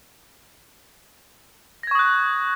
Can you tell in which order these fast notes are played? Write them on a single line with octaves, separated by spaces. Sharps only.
A#6 G#6 C#6 D#6 F#6